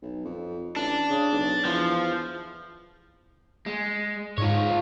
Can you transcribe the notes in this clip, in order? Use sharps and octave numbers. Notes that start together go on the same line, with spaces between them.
B1
F2
A1 D4
C#3
B1
E2 F3
G#3
G#2 F4 C#5